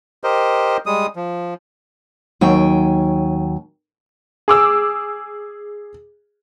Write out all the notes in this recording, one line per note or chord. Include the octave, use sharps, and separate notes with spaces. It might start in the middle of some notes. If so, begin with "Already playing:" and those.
G4 A#4 C5 D#5
G3 G#3 D#6
F3
D#2 F#3 G5 G#5
G#4 D6 E6